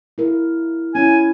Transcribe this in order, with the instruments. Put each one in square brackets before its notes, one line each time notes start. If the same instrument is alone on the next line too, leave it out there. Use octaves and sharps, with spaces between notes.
[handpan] E4 A#4
[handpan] C#4 E4 [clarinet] G#5